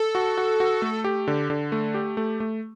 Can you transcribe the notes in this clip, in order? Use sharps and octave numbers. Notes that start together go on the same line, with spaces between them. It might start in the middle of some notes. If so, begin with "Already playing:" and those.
Already playing: A4
F#4
F#4
F#4
A3
G4
D3
D3
A3
G4
A3
A3